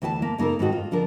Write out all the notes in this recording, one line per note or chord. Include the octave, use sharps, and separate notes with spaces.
D2 E3 E5 G#5 A5
A#3
C#3 A#3 D#4 A4 A#4
G#2 D#3 C4 F#4 A4
F4
D3 F3 D4 A#4